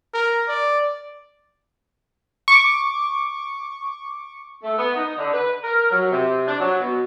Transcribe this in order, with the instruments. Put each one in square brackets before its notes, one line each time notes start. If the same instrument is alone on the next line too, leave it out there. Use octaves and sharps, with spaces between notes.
[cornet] A#4
D5
[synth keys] C#6 D6
[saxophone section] A3
B3
D#4
D3
B4
A#4
F#3
C3
D4
F#3
B2